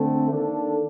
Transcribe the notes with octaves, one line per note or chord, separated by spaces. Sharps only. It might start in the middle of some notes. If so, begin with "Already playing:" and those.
Already playing: D3 A3 C4
D#3 A#3 D4 A4